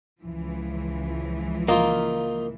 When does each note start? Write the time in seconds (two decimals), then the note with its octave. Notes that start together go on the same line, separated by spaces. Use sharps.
0.20 C#2 E3 F3
1.68 A#3 D#4 F4